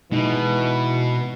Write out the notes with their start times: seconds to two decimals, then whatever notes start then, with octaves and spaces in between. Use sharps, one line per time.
0.12 B2 E3 G#3 D#4